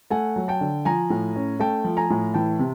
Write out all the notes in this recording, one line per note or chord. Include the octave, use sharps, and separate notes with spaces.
A3 F#5 G#5
F#3
G5 A5
D3
F3 G#5 A#5
A2
C#4
A3 G5 A5
F3
G#5 A#5
A2
E3 G5 A5
C3